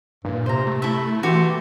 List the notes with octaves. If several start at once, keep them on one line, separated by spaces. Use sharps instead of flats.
G2 A#2
C3 C5 A#5
A3
E4 A4 E5
E3 F#4 G4 C6